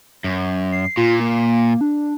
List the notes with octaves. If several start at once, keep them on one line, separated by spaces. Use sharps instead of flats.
F#2
C7
A#2 F4
A#3
D4